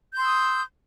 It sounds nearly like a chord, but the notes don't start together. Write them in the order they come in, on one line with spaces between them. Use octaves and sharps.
G6 C6 E6 D#6